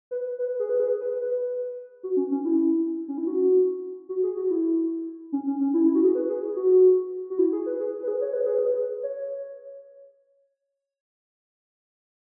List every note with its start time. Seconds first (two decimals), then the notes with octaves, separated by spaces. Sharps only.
0.11 B4
0.39 B4
0.60 G#4
0.69 B4
0.80 G#4
1.00 B4
1.21 B4
2.03 F#4
2.17 C#4
2.31 C#4
2.45 E4
3.08 C#4
3.18 E4
3.27 F#4
4.09 F#4
4.23 G#4
4.36 F#4
4.50 E4
5.32 C#4
5.47 C#4
5.61 C#4
5.74 E4
5.84 E4
5.95 F#4
6.04 G#4
6.15 B4
6.29 G#4
6.42 G#4
6.56 F#4
7.30 F#4
7.39 E4
7.52 G#4
7.66 B4
7.80 G#4
8.03 B4
8.08 G#4
8.21 C#5
8.33 B4
8.46 G#4
8.58 B4
9.03 C#5